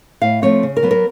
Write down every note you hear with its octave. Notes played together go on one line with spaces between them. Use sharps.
A2 F5
F3 A3 C4 C#5
C#3
A#4
F#3 B3
A#4